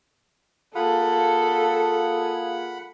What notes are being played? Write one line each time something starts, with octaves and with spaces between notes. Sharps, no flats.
A#3 F4 G#4 A4 F#5 B5